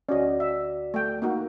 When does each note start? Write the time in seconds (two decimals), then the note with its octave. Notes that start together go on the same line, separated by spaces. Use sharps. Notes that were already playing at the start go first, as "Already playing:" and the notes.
0.09 D2 C#4 F#4 D5 D#5
0.40 E5
0.94 A3 G5
1.22 A#3 D#4 F#4